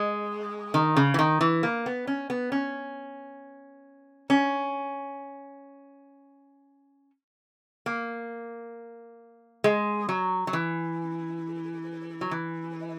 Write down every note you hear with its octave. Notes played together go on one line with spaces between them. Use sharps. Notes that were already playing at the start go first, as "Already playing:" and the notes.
Already playing: G#3
D#3
C#3
E3
D#3
E3
A#3
B3
C#4
B3
C#4
C#4
A#3
G#3
F#3
F#3
E3
F#3
E3